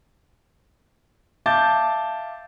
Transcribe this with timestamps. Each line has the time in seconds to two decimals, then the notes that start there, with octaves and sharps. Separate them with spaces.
1.46 E5 F5 A5 D6 G6 A6